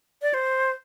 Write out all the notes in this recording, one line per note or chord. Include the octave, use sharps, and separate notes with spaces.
D5
C5